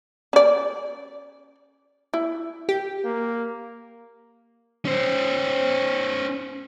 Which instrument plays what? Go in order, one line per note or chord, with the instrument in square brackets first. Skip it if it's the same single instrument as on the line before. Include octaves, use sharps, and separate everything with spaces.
[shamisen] C#4 D5
E4
[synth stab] G4
[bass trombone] A#3
[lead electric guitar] C#4 C5